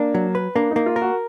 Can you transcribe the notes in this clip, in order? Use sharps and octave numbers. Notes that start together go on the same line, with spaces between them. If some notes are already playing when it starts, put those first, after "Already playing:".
Already playing: A#3 D4
F#3
B4
A#3 D4
D#4
A#3
F4
A#4
F#4